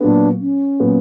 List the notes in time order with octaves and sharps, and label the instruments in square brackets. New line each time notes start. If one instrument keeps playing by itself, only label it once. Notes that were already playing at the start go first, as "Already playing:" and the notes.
[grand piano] A#2 F#3 B3 [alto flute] D4
[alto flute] C#4
[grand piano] A#2 F#3 B3